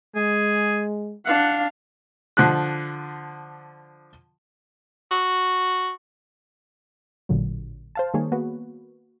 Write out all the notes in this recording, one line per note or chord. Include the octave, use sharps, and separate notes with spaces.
G#3 G#4
D4 F5 F#5
D3 F3 F#6
F#4
A1 A#2 D3 F#3
C5 F5 A5
D#3 G3 A#3 G#4 C#5
A#3 B3 F#4 B4